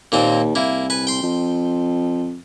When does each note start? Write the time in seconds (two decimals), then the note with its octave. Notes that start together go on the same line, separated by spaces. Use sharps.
0.12 D#2 A#2 A#3 C4
0.55 C2 A#3 E4
0.90 B4 G#5
1.07 G5 C6
1.23 F2